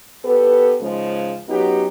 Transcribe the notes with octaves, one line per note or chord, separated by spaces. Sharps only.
B3 G4 A4 B4
G#2 C#3 F3 G#3
F#3 B3 C#4 D#4 F#4 G4